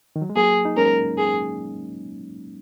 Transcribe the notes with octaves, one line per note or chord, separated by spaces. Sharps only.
D#3
F#3
G#3
F#3 A#3 G#4
D#4
G#3 C#4 A#4
G#4